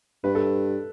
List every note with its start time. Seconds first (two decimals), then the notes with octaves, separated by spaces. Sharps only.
0.24 G2 B4
0.35 A4